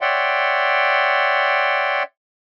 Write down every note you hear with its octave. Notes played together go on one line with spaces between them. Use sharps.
C#5 D5 E5 F#5 G5 C6